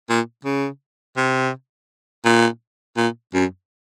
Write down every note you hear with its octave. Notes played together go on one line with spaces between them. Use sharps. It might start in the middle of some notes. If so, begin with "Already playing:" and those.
A#2
C#3
C3
A#2
A#2
F#2